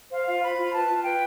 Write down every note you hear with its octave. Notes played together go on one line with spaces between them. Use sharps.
C5 F5
F4 F5
C5 B5
F4
B4 A5
F4
B4 G5